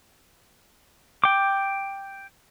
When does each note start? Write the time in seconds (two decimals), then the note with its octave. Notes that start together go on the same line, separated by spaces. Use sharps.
1.24 G5 D6